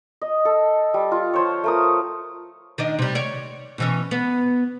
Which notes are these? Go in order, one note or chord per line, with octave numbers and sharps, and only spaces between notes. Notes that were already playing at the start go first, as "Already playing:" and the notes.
D#5
A4
G3
F4
F3 C5 C#5
A3 A#4 D#6
D#3 D4 D#5
C3 G3
C#5 D5
B2 E3 C#4
B3